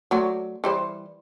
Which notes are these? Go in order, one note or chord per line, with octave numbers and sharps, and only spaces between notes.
F#3 A3 D5
E3 G3 C5